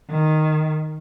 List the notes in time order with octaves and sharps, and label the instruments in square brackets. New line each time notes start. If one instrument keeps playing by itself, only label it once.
[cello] D#3